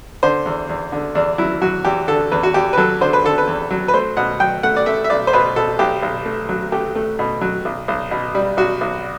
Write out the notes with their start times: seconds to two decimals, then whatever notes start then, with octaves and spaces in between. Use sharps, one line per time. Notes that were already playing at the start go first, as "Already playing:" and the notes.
0.23 D3 C5
0.46 E2
0.69 E2
0.92 D3
1.15 E2 D4
1.38 F#3 E4
1.62 F#3 F#4
1.85 E2 G4
2.08 D3 A4
2.32 E2 B4
2.43 F#4
2.54 E2 G4
2.73 B4
2.77 F#3 A4
3.01 D3 C5
3.13 B4
3.24 D3 A4
3.38 B4
3.47 E2
3.70 F#3
3.88 B4
3.93 A3 C5
4.17 B2 F#5
4.40 F#3 G5
4.63 A3 F#5
4.76 D5
4.86 A3 E5
5.04 E5
5.10 B1 D5
5.27 C5
5.33 B2 B4
5.56 B2 A4
5.79 B1 G4
6.02 B1
6.25 A3
6.49 F#3
6.72 A3 G4
6.95 A3
7.19 B2
7.41 F#3
7.65 B1
7.88 B1
8.11 B2
8.35 G3
8.57 B1 F#4
8.81 B1